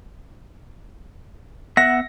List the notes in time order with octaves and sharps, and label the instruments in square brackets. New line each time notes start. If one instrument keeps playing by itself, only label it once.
[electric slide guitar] B3 E5 F#5 [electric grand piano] A#6